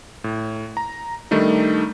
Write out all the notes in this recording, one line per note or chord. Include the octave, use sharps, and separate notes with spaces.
A2
A#5
D#3 G3 A3 D4 D#4